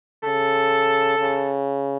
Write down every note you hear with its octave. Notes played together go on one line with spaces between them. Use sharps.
C#3 A4
C#3